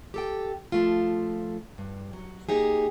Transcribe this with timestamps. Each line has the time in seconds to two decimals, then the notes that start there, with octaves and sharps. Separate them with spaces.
0.14 G4 A4 G5
0.72 F3 A3 F4
1.78 G2
2.13 F#3
2.49 A#3 D#4 G4 G#4